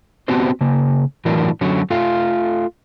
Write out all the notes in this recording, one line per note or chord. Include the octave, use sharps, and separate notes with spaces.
B3 C4 D4 F#4 G4 C5
C#3 A#3
A2 E3 F#3 D4 E4 A#4
D3 F#3 C#4 F#4
A3 F4 A4 F5